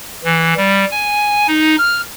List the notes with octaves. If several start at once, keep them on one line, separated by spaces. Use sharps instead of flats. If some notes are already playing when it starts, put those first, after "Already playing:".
E3
G3
G#5
D#4
F6